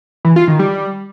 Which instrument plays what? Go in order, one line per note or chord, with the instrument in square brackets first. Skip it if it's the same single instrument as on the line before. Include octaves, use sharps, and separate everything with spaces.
[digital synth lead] E3
F4
D#3
G3